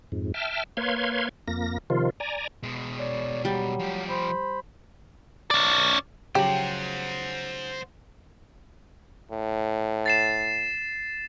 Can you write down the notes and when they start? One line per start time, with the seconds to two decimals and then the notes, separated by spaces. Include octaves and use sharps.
0.12 F2 G#2
0.34 E5 G5 A5 F6
0.77 A#3 B4 C#5 F5 C6 G#6
1.48 F2 A#3 A#6
1.90 C3 D#3 F3 F4
2.20 D5 G#5 A#5
2.63 B2 G#3
2.98 C#5 D5
3.45 F#3 G3
3.80 F3 G4
4.10 C5 B5
5.51 C#4 D5
6.35 C#3 F3 F#3 G4 C5 F#5
9.31 A2
10.06 A6 C7 E7